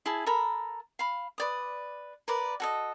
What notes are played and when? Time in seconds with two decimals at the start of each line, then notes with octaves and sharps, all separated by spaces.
0.06 E4 G#4 A5
0.26 A4 A#4 A#5 B5
0.99 F5 B5
1.38 B4 D5 D#6
2.28 A#4 B4 D5
2.60 F#4 A4 D#5